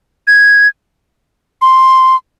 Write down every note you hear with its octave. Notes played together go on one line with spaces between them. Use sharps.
G#6
C6